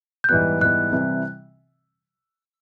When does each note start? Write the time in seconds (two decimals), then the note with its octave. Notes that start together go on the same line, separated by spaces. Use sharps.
0.24 G6
0.29 G#2 E3 G3 B3 F#6
0.61 G#2 E3 G3 B3 F#6
0.92 C3 E3 G3 C4 E4